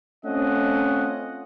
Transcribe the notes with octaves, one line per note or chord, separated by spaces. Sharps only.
A3 C4 C#4 F4 D#5 F#5